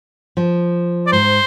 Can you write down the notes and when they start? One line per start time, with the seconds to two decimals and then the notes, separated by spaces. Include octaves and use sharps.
0.37 F3
1.06 D5
1.12 G#2 C5